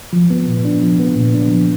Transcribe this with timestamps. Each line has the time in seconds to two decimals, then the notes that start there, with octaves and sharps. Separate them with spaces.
0.13 F3
0.30 B3
0.47 A#2
0.65 D4
0.83 F3
1.00 B3
1.16 A#2
1.34 D4
1.51 F3